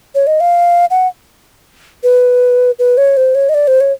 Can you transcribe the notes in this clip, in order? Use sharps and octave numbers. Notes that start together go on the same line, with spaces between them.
C#5
D#5
F5
F#5
B4
B4
C#5
C5
C#5
D#5
D5
C5
C#5